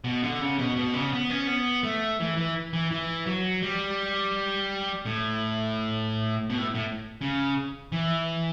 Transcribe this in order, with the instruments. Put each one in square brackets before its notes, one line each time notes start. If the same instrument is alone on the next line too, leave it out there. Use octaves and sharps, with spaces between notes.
[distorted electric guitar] B2
D3
C#3
B2
B2
C#3
B3
C#4
B3
A3
E3
E3
E3
E3
F#3
G3
A2
B2
A2
A2
C#3
E3